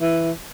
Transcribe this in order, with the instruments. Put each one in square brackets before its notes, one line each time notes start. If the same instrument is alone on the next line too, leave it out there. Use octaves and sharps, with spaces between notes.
[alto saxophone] E3